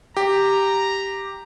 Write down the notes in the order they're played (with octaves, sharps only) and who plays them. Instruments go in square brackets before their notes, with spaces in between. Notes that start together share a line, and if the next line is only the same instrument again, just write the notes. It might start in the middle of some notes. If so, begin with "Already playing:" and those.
[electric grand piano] G4 [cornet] A#5